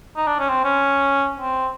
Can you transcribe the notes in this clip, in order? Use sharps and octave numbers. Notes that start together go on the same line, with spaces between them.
D#4
D4
C#4
C4
C#4
C4